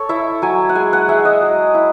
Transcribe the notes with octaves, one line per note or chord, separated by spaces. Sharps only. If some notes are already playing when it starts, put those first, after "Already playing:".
Already playing: A4 C#5
E4 E5
F#3 G#5
F#5
G#3 G#5
F#5
G#3 E5
D#5
F#3
E4